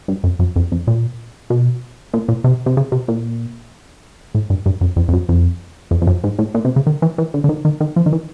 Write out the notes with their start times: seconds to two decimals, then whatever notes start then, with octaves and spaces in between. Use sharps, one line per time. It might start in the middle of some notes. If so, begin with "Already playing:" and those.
0.08 G2
0.24 F#2
0.39 F#2
0.56 F2
0.72 F2
0.87 A#2
1.50 B2
2.13 A#2
2.28 A#2
2.44 C3
2.66 C3
2.77 C#3
2.92 C3
3.08 A#2
4.35 A2
4.50 G2
4.66 G2
4.81 F#2
4.96 F2
5.08 F2
5.13 F#2
5.29 F2
5.91 F2
6.02 F2
6.07 F#2
6.24 G#2
6.39 A2
6.54 A#2
6.65 C3
6.76 C#3
6.87 D#3
7.02 E3
7.18 E3
7.34 D3
7.44 D3
7.49 D#3
7.65 D#3
7.80 D#3
7.96 F3
8.06 D#3
8.12 E3